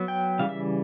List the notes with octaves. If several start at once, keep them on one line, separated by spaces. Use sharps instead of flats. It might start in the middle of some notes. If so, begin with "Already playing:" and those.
Already playing: F#3 B3
G5
C#3 E3 G3 F5
E5